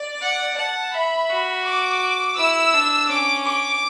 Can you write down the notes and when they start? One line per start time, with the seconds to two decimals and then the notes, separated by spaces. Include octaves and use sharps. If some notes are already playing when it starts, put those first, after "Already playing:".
Already playing: D5
0.21 F#5
0.57 F#5 A5
0.93 E5 B5
1.29 F#4
1.66 D6
2.37 E4 E6
2.73 D4
3.09 C#4 D6
3.45 D6